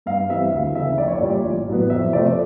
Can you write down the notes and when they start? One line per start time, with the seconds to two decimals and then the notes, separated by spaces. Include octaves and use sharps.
0.06 G2 F5
0.29 E3 G3 C4 E5
0.52 D2 F5
0.75 C#3 E3 E5
0.98 A#1 D5
1.08 C#5
1.18 A#2 G3 D5
1.44 A1
1.68 A2 F#3 B3
1.90 F2 E5
2.13 C3 F3 A3 D5